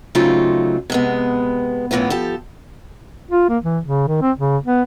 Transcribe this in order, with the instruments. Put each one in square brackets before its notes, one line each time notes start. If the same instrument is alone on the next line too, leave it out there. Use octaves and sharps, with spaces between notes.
[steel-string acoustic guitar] C#3 F#3 A3 C4 D#4 F4
C3 G#3 B3
F#2 A2 E3 B3 F4
F3 G4 A4
[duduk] F4
A#3
E3
C#3
D#3
C4
C#3
B3